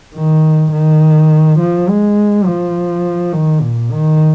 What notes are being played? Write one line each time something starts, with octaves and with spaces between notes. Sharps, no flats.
D#3
D#3
F3
G#3
F3
D#3
A#2
D#3